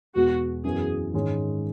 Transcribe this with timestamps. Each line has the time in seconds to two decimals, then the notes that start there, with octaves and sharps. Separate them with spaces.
0.15 E2 B2 G#3 B3 F#4
0.64 F#2 E3 B3 F#4 G#4
1.14 G#2 D#3 G#3 C#4